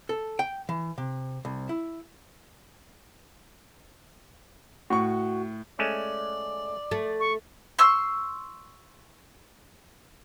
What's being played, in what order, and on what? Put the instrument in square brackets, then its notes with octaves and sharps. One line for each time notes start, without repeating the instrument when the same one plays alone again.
[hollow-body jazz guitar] A4
G5
E3
C3
C2
E4
[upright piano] A2 C#6 [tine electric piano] F#4
[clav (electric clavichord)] G#3 A3 C#4 [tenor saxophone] D5
[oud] A3
[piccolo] C#6
[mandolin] C6 C#6 E6